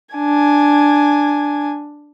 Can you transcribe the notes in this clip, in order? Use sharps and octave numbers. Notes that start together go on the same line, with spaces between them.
D4 G#5